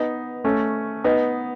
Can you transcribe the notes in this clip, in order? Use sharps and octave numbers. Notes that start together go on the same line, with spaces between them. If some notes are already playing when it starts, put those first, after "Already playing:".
Already playing: B3 D#4
A3 C#4
B3 D#4